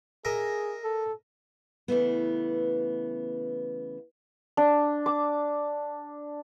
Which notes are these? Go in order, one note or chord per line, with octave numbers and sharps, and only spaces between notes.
G#4 A#4 D#5 E5
A4
C#3 E3 A3 B3
D4
D6